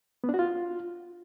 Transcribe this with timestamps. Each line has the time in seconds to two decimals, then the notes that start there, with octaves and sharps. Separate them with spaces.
0.24 B3
0.29 D4
0.34 F#4
0.39 F4